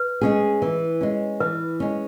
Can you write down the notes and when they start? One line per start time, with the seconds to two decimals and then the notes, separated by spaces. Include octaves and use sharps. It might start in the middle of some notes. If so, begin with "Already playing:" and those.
Already playing: B4
0.21 G#3 C#4 G#4
0.62 E3
1.01 G#3 C#4
1.40 E3 B4
1.80 G#3 C#4